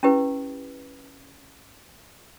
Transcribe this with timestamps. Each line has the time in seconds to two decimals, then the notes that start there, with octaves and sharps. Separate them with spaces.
0.03 C#4 E4 G4 B4